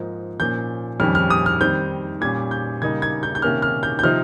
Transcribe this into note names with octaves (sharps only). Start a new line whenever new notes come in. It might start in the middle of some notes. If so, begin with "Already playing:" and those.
Already playing: G#2 F3 A#3 D#4
A#2 F3 A#3 C#4 G6
F2 D#3 G3 C#4 F6
F6
D#6
F6
D#3 G3 C4 G6
A#2 G3 C#4 G#6
G6
C#3 G3 A#3 D#4 G#6
G#6
G6
G6
C3 D#3 A#3 C#4 F6
F6
G6
G6
C3 F3 C4 D#4 F6